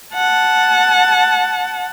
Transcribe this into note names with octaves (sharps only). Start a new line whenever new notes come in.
F#5 A5